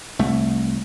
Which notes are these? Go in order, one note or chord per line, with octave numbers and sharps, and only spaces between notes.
C2 A3